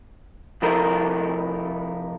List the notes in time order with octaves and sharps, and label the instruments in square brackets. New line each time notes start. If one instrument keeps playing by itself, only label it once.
[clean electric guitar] C3 F3 D#4 E4 A4 A#4